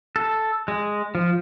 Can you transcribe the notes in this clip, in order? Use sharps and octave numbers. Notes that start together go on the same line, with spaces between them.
A4
G#3
F3